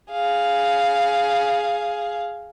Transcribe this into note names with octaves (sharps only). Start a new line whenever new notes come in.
G#4 F5